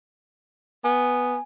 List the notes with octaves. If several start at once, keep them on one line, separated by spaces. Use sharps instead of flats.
B3 G#5